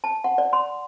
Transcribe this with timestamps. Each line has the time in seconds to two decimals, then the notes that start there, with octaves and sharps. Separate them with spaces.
0.04 A5
0.24 F#5
0.38 D5
0.53 C6